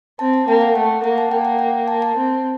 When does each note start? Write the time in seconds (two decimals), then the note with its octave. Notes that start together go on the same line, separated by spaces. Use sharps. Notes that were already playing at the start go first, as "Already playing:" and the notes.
0.19 C4 A5
0.34 A5
0.47 A#3 G5
0.61 F#5
0.75 A3 F#5
1.03 A#3 F#5
1.18 A5
1.31 A#3 G5
1.45 F#5
1.59 G5
1.88 A5
2.02 A5
2.16 C4